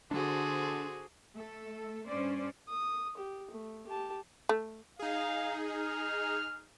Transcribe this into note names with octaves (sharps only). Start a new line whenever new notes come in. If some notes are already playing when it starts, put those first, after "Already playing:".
D3 D4 F#4 G#4 C5
A3 A4
G2 C#4 C5 D5
D#6
G4
A3
G4 A5
A3
D#4 G#4 F5
F6